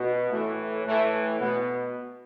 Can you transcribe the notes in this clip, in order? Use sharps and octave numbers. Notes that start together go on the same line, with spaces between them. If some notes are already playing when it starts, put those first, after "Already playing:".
Already playing: B2
A2 E3 A3
A2 E3 A3
B2 B3